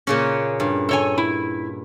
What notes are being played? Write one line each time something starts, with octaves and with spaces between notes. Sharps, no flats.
A#2 C#3 C#4
G2
A4 C#5 G#5
E4